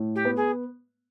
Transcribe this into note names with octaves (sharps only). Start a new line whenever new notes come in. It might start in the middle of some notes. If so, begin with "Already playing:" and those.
Already playing: A2
G4
B3
G#4